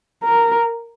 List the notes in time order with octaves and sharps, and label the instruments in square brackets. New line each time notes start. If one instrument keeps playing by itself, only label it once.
[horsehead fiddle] A#4